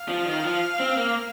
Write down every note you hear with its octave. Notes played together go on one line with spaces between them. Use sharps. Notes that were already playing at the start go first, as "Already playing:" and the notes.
Already playing: F5
F3
D#3
F3
C4
A#3